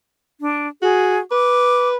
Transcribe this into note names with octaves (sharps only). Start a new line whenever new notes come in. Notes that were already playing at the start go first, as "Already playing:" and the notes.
D4
F#4 G#4
B4 D6